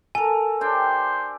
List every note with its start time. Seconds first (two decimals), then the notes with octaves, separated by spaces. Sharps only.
0.15 A4 A#4 G#5
0.61 D4 G4 C5 G5